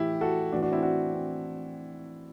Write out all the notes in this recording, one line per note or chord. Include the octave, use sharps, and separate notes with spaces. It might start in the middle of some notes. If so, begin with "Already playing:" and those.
Already playing: A2 E3 E4 G4
F#4 A4
A2 E3 D4 F#4
D4 F#4
C4 E4
D4 F#4
C4